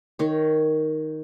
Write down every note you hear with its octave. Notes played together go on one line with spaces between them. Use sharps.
D#3 C#5